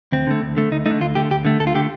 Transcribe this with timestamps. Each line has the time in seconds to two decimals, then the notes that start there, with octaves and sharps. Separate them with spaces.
0.12 D2 C4
0.27 D3 A3
0.42 D2
0.57 D3 A3
0.71 D2 D#4
0.86 D3 A3 D#4
1.01 D2 F4
1.15 D3 A3 G4
1.31 D2 G4
1.45 D3 A3
1.60 D2 A4
1.67 F4
1.74 D3 A3 G4